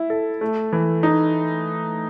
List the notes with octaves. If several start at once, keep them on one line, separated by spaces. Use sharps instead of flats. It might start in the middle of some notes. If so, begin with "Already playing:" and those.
Already playing: E4
A4
A3
E3
D#4